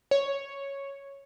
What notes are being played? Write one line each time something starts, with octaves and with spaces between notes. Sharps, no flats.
C#5